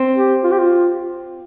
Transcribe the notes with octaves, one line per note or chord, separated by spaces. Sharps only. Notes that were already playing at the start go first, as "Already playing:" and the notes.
Already playing: C4
G4
F4
G4
F4